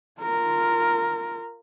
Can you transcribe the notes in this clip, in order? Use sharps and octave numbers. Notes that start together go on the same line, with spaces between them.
F4 A#4